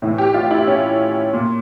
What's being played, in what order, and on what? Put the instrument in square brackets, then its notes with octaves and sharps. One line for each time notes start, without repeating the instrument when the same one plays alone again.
[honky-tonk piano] A2 E3
G4
F4
E4
C#4
A#2